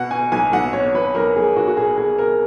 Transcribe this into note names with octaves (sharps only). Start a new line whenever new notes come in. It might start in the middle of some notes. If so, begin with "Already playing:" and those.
Already playing: B2 F#5
B2 G#5
B1 G#5
B1 F#5
B2 C#5
B1 B4
B1 A#4
B1 G#4
B1 F#4
F#4
B2 G#4
B2 G#4
B2 A#4